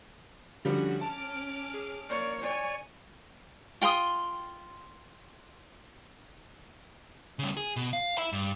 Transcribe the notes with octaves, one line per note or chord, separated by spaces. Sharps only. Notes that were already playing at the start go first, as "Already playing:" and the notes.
D3 F3 G3 C#4 F#4
C#4 A5 D6 F6
G#4
A#3 C#5 D5
C#5 D5 G#5
F4 G5 C6 D#6
C#3 G3
G#4
B2
F5
E5 B5
G2